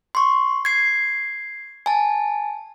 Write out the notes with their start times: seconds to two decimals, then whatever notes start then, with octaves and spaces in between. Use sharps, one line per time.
0.15 C6 C#6
0.65 G#6 C7
1.86 G#5 A5